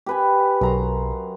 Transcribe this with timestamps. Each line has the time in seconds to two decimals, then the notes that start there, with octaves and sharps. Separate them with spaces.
0.06 G4 B4 G#5
0.61 B1 F#2 A#5 C6